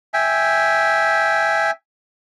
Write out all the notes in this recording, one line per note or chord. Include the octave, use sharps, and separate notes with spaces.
E5 G5 G#5